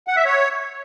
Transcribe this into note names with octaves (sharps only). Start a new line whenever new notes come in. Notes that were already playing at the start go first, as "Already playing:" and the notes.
F#5
E5
C#5